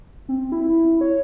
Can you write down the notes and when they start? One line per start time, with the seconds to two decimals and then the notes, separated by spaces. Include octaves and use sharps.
0.29 C4
0.52 E4
1.01 C#5